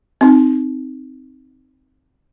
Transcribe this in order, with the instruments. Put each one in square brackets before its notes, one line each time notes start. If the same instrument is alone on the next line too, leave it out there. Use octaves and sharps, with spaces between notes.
[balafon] C4 D#4